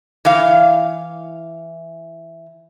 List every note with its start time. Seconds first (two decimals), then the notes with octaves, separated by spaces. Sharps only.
0.25 E3 F5